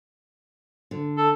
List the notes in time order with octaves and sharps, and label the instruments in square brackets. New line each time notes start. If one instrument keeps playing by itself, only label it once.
[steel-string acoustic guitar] D3
[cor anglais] A4